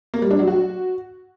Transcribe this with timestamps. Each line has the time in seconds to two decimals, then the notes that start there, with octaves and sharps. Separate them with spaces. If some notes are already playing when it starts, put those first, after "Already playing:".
0.14 A#3
0.22 G3
0.31 D4
0.39 F#3
0.48 F#4